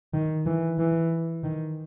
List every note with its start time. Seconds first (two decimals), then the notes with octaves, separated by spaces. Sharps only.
0.14 D#3
0.46 E3
0.79 E3
1.44 D#3